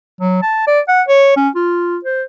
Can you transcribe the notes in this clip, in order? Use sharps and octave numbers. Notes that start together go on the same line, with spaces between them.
F#3
A5
D5
F#5
C#5
C#4
F4
C5